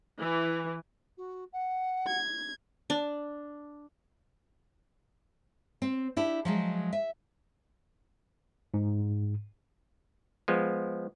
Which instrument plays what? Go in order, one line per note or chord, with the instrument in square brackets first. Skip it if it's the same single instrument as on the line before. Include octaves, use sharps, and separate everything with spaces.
[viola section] E3
[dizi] F#4
F#5
[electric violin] G#6
[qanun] D4
[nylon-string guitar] C4
D4 E4 G4
F3 F#3 G#3
E5
[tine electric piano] G#2
[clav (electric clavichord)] F3 G#3 B3